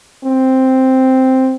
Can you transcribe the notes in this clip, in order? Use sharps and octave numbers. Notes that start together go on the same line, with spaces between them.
C4